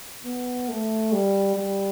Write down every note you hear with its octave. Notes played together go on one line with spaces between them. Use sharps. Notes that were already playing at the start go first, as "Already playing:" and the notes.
B3
A3
G3
G3